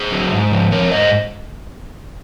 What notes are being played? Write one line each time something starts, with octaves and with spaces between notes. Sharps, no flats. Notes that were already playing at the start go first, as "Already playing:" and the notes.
Already playing: G#4 C5
F#3
G#2
F3
F3 A#4 C#5
G#2 C5 D#5